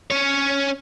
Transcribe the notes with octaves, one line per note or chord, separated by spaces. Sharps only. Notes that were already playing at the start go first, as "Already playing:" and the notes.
C#4 C#5